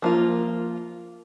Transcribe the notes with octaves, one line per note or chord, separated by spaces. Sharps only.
F3 A#3 F4